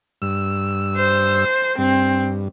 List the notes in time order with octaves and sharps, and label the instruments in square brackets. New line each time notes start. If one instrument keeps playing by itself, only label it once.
[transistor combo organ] G2 E6
[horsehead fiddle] C5
[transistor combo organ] G2 [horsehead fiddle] C4